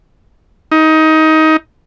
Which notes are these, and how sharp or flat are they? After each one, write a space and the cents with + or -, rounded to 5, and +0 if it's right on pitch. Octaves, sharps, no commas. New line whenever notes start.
D#4 +20